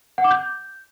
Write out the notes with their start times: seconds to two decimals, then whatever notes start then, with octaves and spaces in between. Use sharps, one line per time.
0.18 F#5
0.24 D6
0.31 G6